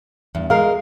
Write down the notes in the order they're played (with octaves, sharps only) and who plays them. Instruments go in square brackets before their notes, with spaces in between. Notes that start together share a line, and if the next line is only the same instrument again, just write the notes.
[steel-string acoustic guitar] E2 G2
[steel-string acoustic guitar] G#3 A#4 [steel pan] F5